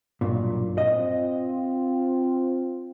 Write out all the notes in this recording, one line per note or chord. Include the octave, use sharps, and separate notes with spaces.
B1 G2 A#2
C4 F4 D#5